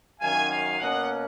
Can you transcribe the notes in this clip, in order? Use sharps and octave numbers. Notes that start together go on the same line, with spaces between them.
F#2 D#3 F#3 C#4 F5 G#5
F5 G#5
B2 A#3 C#4 D#5 F#5